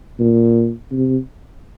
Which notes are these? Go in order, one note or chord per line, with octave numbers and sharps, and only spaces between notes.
A#2
C3